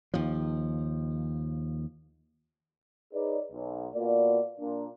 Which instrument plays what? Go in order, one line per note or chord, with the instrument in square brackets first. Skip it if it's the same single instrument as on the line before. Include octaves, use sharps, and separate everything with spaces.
[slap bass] D#2 F3
[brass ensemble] D#4 G#4 B4 C#5 D5
B1
B2 A#3 F4 D5
A#2 D4